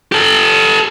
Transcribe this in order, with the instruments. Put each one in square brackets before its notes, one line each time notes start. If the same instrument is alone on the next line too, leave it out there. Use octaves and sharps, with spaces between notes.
[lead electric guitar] G4 A4